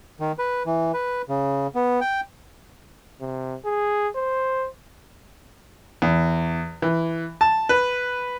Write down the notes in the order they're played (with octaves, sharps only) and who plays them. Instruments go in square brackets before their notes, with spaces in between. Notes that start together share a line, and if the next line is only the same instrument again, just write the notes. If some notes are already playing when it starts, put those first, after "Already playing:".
[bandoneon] D#3
B4
E3
B4
C#3
B3
G5
[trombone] C3
G#4
C5
[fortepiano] E2
E3
A5
B4